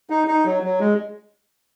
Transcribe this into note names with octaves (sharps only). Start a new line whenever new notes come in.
D#4
D#4
F#3
F#3
G#3